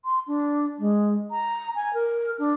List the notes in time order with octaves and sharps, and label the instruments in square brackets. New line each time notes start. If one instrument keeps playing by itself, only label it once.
[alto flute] C6
D4
G#3
A#5
G#5
A#4
D4